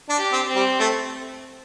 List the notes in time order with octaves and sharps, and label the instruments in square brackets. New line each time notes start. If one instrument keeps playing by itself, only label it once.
[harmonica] D4
[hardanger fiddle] G4
[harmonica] C4
[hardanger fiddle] C4
[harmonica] G3
A3